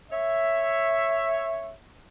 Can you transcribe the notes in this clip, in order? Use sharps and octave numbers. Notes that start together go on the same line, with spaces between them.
C#5 E5